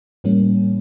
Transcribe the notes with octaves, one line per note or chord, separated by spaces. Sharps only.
A2 E3 G3 A#3 C#4